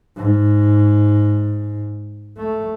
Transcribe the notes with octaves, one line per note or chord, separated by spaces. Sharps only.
G#2
A3